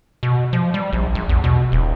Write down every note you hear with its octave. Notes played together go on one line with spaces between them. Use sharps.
B2
F3
G3
A#1
A#1
E2
B2
D#1